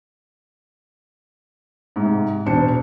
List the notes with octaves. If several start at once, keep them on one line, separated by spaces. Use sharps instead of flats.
G#2 C3
E1 D4 C5 C#7